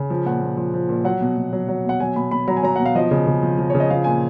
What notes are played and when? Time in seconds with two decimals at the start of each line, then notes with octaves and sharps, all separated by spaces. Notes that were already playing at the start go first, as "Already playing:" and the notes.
Already playing: C#3
0.10 F3
0.26 A#2 F#5
0.42 A#2
0.57 F3
0.74 F3
0.89 A#2
1.05 F#3 F#5
1.21 B2
1.37 B2
1.53 F#3
1.68 F#3
1.85 B2 F#5
2.00 F#3 G#5
2.16 B2 B5
2.31 B2 B5
2.48 F#3 A#5
2.57 G#5
2.63 F#3 A#5
2.76 B2 F#5
2.86 F5
2.95 F3 D#5
3.11 C#3
3.27 C#3
3.43 F3
3.59 F3
3.70 C#3 C#5
3.80 D#5
3.90 F3 F5
4.04 A#2 G#5